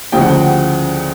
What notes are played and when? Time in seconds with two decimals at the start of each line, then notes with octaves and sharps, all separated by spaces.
0.12 D2 C#3 F3 G5
0.21 F#5
0.29 G5